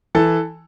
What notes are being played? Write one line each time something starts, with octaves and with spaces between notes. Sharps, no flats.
E3 A4 A5